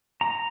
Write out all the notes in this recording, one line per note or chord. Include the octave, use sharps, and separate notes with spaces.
A#5